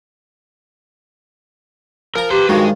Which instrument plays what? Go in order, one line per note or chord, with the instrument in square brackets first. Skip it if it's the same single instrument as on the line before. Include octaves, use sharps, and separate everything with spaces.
[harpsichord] F3 A#5 [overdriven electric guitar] A#4
[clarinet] G4 [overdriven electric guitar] B4 C6
[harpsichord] G2 D#3 F3 [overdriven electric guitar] G#3 [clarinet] F#4